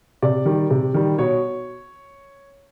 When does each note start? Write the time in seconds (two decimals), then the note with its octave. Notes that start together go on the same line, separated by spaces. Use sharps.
0.22 C3 D5
0.46 D#3 G3
0.70 C3
0.94 D#3 G3
1.18 B2 C#5